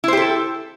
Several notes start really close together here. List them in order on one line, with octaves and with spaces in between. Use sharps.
E4 C5 G4 A4